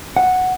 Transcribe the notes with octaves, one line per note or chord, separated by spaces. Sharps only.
F#5